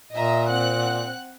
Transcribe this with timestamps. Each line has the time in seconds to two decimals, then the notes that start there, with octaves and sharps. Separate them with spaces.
0.12 A#2 D#5 E5 A#5
0.50 C4 F#5 F#6